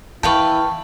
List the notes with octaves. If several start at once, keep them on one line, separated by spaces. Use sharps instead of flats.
E3 E4 B4 F5 G5 A5 C#6